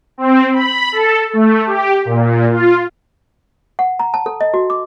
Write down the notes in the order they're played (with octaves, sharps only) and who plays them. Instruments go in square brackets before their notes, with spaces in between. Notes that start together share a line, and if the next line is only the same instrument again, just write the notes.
[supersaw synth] C4
B5
A4
A3
G4
A#2
F4
[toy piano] F#5
A#5
A5
A4
D#5
F#4
D6